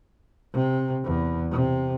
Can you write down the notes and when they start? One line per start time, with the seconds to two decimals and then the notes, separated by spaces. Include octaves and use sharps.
0.53 C3
1.04 E2
1.51 C3